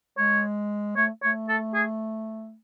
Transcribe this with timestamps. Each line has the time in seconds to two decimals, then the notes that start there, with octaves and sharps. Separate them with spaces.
0.17 G#3 C#5
0.97 A3 C#5
1.23 A3 C#5
1.49 A4
1.74 G#4